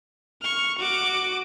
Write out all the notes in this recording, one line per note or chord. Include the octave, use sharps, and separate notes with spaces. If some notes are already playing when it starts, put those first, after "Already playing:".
C#6 F6
F#4 D6